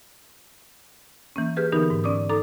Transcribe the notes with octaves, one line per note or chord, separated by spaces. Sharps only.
E3 A#3 C#4
G4 G#4 B4 F6 G6
D3 E3 B3 D#4 G4 A#4
G#2
C#4 D5 D6 D#6
D#4 A4 A#5 D6